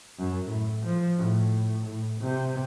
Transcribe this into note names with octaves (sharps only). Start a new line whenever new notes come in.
F#2
A2
F3
A2
A2
C3